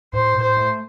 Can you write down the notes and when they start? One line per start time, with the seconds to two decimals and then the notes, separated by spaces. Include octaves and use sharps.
0.13 A2 C5
0.35 A2
0.42 C5
0.57 A3